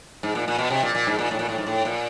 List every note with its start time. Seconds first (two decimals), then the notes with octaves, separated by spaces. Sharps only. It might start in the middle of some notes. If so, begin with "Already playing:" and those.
0.23 G#2
0.35 A#2
0.48 A#2
0.59 B2
0.71 C3
0.83 A#2
0.95 A#2
1.07 G#2
1.19 A#2
1.31 A2
1.39 A#2
1.49 A2
1.58 G#2
1.67 A2
1.85 A#2